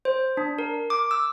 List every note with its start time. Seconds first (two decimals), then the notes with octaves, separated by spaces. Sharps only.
0.05 C5
0.37 D4
0.58 A#4
0.90 D6
1.11 E6